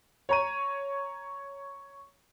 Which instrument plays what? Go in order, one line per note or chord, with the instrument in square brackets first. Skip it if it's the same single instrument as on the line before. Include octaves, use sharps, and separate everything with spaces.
[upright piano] C#5 A#5 D#7